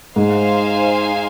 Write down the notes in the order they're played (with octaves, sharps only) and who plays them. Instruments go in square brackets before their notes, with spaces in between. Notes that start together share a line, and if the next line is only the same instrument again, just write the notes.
[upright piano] G#2 [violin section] D#4 C5 F5 G#5